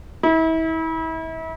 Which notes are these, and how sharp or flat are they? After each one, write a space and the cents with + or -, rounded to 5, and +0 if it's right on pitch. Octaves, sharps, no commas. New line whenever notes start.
E4 -35